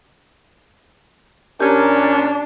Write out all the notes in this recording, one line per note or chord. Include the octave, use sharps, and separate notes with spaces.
A#2 C#4 D4 G4 A#4